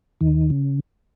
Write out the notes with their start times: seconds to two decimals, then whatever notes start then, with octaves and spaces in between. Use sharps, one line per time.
0.21 D#2 D#3
0.50 C#3